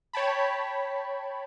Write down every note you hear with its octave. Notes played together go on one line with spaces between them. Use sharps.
C#5 G5 A5 B5